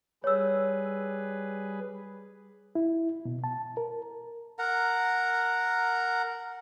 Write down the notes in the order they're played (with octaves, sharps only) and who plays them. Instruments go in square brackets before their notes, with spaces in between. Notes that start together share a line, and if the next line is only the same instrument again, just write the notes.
[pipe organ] G3 G#4 B4 [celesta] C#5 E6
[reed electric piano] E4
B2
A5
A#4
[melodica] A#4 F#5 A#5